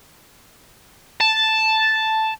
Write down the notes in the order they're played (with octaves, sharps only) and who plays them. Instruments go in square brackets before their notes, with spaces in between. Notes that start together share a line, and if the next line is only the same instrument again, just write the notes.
[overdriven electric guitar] A5